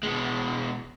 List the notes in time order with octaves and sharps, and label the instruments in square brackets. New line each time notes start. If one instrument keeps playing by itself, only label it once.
[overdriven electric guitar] B2 G#3